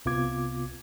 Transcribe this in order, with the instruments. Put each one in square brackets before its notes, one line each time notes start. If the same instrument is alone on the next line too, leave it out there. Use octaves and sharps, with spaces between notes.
[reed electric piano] C2 C3 B3 F4 D6 G#6